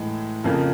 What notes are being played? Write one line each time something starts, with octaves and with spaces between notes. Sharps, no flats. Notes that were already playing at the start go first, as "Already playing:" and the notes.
Already playing: A2 E3 G#3
F2 C#3 F3 A#3